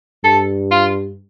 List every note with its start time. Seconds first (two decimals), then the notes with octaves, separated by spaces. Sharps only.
0.24 G2 A4
0.71 F4